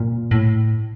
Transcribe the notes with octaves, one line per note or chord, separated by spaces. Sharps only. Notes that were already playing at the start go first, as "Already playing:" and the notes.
Already playing: A#2
A2